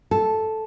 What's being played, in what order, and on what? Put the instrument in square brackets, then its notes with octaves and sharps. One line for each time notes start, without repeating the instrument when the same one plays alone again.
[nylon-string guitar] A4